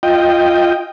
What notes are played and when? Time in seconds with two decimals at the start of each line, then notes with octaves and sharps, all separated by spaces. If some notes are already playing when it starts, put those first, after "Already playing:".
0.03 F4 D#5 G5